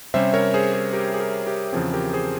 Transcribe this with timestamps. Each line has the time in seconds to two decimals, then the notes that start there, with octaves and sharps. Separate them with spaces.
0.14 C3 G3 C#4 C5 E5
0.34 A#4 C#5
0.54 G#4 C5
0.74 G#4
0.93 G4 A#4
1.13 G#4
1.20 G4 A#4
1.46 G4 A#4
1.73 E2 C#3 F3 C4 G#4
1.93 G4 A#4
2.13 G#4 C5